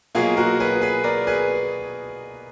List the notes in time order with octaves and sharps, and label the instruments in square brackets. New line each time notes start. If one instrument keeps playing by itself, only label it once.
[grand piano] B2 F#3 A#3 F4 G#4
F#4 A#4
G#4 B4
G#4 B4
A#4 D5
G#4 B4